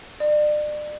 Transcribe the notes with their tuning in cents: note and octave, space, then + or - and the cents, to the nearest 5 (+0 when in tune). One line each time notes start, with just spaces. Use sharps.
D5 +35